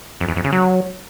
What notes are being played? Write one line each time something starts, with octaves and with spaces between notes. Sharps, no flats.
F2
E2
F2
C#3
F#3